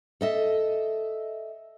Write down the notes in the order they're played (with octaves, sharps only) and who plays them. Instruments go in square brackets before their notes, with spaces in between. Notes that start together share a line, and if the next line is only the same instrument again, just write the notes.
[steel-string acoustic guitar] A4 D#5 E5